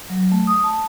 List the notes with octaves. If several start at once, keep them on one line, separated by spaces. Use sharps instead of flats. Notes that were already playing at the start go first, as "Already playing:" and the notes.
F#3
A3
D#6
A5